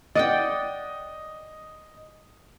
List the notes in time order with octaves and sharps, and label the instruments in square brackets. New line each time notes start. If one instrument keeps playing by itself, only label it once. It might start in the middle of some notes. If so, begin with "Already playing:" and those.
[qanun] D5 F#5 G5 [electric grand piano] D#5 D#6